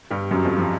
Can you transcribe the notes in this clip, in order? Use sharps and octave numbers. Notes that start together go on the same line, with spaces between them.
G2 G3
F#2 F#3
F2 F3
F3